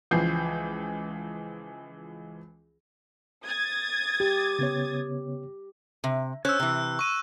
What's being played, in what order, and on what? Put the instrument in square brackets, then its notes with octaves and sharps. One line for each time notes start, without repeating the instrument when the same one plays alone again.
[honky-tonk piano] C#2 E3 F3 G6 C7
[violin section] D#6 G#6 A6
[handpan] G4
[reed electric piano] C#3 B3 C#5
[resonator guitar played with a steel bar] C3
[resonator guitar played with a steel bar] C#4 C5 C#5 [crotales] E6 F#6
[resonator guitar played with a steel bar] C3 E3
[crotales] C#6 D#7